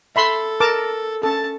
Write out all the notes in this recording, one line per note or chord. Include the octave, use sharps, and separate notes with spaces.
A4 E5 B5 C6
A#4 A5 D6
C#4 A4 A5